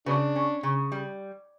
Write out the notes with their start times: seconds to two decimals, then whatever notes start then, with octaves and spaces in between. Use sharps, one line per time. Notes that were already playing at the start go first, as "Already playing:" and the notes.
0.06 C#3 F#3 B3 D4
0.36 C#4
0.63 C#3
0.92 G3